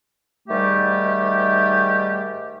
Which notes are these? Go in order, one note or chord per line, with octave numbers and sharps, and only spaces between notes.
G#2 D#3 G3 A3 G4